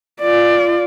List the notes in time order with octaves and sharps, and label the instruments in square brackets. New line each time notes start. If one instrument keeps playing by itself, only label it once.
[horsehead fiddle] F4 D5